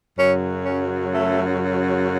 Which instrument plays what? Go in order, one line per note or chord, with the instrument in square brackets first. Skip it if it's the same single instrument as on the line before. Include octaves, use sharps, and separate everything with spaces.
[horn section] F#2 C#3 F#3 C#4
C#4
A3